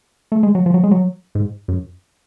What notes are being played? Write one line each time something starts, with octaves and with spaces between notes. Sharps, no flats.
A3
G#3
F#3
F3
F#3
G#3
F#3
G#2
F#2